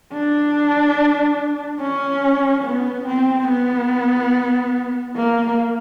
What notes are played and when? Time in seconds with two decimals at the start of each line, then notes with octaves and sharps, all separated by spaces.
0.13 D4
1.81 C#4
2.65 B3
3.07 C4
3.48 B3
5.16 A#3